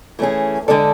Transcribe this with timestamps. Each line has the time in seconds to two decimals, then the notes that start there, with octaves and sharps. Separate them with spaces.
0.19 E3 A3 C#4 G#4
0.68 D3 G#3 D4 A4 D5